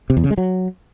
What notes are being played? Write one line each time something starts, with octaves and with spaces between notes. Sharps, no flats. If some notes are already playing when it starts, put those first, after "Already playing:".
C3
E2
C#3
G#3
F#3